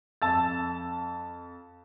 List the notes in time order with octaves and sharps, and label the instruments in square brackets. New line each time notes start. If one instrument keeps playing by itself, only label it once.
[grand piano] F2 A5 E6 A6